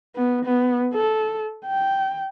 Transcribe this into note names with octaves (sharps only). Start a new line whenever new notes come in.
B3
B3
A4
G5